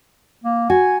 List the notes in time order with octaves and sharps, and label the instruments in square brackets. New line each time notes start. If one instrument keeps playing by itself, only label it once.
[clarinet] A#3
[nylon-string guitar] F#4 [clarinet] G#5